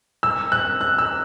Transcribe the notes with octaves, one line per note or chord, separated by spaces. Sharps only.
E6
F#6
F#6
E6